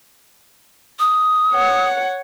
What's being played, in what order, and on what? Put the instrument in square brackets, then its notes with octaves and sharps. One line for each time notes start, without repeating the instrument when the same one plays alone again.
[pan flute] D#6
[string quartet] C#5 F#5